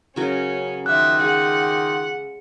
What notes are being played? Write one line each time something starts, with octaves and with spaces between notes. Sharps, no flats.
C#3 F#3 C#4 A#4
D#3 F4 E5 D6 F#6
G#3 F#5